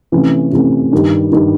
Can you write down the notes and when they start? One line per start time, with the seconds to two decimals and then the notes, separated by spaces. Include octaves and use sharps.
0.12 C3 E3 A3 C#4
0.52 C3 E3 A3 C#4
0.93 G2 D#3 G3
1.32 G2 D#3 G3